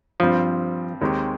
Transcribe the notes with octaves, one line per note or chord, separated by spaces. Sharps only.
G2 F3 G3 C4
D#2 D#3 G#3 C4 G4